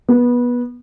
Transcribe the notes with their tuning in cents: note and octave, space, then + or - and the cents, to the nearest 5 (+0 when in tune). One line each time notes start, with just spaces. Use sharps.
B3 -20